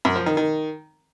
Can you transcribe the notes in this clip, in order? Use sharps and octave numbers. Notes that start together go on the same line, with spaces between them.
F#2
F3
D#3
D#3